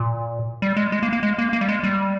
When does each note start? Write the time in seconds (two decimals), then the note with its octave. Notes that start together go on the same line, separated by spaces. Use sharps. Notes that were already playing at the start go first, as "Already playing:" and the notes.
Already playing: A#2
0.62 G3
0.77 G#3
0.92 G#3
1.03 A#3
1.13 A#3
1.23 G#3
1.38 A#3
1.53 A#3
1.61 G3
1.68 G#3
1.83 G3